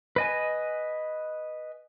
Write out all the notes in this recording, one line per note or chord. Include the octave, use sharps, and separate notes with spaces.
B4 D#5 G#5